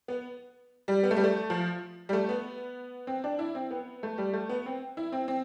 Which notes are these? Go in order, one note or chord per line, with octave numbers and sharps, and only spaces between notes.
B3
G3
B3
A3
G3
A3
F3
G3
A3
B3
C4
D4
E4
C4
B3
A3
G3
A3
B3
C4
E4
C4
C4